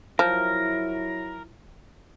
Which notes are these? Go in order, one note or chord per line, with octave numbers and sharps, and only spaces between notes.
F3 F#3 E4 A#4